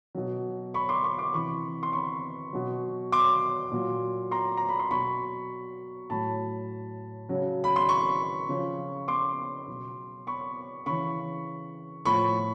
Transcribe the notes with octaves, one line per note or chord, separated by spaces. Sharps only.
B2 F#3
B5 C#6
C6 D6
B5 C#6
C6 D6
C3 E3 B5 C#6
C6
B5 C#6
B2 F#3
C6 D6
A#2 F#3
A#5 C6
A#5
B5
C6
B2 F#3 B5 C#6
A2 F#3 A5 B5
C#3 F#3
B5
C6
B5 C#6
C#3 F3
C6 D6
B2 F#3
B5 C#6
C#3 E3 B5 C#6
A2 F3 B5 C#6